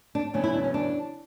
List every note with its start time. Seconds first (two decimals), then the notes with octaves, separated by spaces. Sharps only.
0.15 D4
0.34 E2 C#3 F#3 B3 D4
0.44 E4
0.54 D4
0.64 C#4
0.74 D4